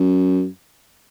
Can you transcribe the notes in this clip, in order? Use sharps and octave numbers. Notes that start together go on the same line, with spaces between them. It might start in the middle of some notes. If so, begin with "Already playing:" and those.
Already playing: F#2